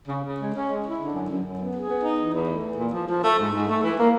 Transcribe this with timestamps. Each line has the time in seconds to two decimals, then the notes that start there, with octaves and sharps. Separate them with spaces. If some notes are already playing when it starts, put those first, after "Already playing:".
0.08 C#3
0.23 C#3
0.38 G#3
0.53 C#4
0.68 G#3
0.83 E4
0.98 D3
1.13 F#2
1.28 F#2
1.43 F#2
1.58 B3
1.73 G#4
1.88 B3
2.03 D#4
2.17 E3
2.33 E2
2.47 A3
2.63 E3
2.77 A#2
2.92 F3
3.08 F3
3.22 A3
3.38 G#2
3.52 G#2
3.67 A3
3.82 E3
3.97 A#3